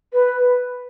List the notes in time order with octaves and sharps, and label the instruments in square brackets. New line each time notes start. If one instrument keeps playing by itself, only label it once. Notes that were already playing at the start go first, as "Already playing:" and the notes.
[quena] B4